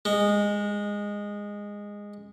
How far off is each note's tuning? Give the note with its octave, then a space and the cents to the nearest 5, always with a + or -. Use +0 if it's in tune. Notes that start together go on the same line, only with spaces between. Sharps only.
G#3 -15